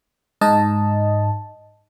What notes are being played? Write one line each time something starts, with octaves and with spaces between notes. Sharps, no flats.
G#2 D#4 D#5 A5